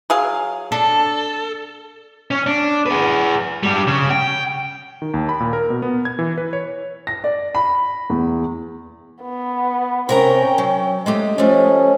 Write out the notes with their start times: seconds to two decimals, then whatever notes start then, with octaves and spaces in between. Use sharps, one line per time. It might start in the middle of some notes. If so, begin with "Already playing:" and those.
0.10 F#3 G#4 F5
0.72 D4 A4
2.31 C#4
2.47 D4
2.86 G#4 B4
3.63 G2 G3
3.87 C#3
4.10 G5
5.02 D#3
5.14 D#2
5.29 B5
5.40 A#2
5.53 A#4
5.70 B2
5.82 B3
6.05 G#6
6.19 E3
6.38 B4
6.53 C#5
7.07 A#6
7.24 D5
7.55 B5
8.10 E2
9.22 B3
10.09 C3 C#4 A#4 G5 A#5
10.58 F#3
11.06 G#3 A3 G4 D#5
11.38 F3 A3 C#4